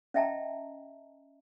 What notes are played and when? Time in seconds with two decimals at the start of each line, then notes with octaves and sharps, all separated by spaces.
0.14 C#4 D#5 E5 G5 A5 A#5